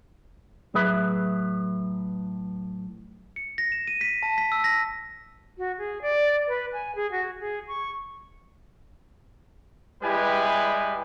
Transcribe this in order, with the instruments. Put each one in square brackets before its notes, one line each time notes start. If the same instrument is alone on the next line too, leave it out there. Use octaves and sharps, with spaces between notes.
[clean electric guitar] A2 F#3 G#4 B4 E5 B5
[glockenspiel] C#7
A#6
E7
D#7
B6
A5
B6
E6
A#6
[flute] F#4
G#4
D5
B4
G#5
G#4
F#4
G#4
C#6
[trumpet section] G3 G#3 E4 G4 B4 G#5